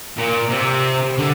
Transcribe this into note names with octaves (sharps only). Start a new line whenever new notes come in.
A#2
C3
D3